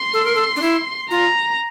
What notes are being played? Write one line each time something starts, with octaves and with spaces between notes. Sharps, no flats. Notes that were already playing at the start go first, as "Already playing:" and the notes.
Already playing: C6
A4
A#4
A4
D4
E4
F4 A#5